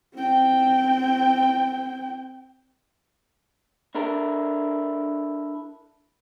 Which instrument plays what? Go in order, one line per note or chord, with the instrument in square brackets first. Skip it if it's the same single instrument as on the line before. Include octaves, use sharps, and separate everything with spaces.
[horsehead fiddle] C4 G5
[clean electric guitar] D4 E4 A4 A#4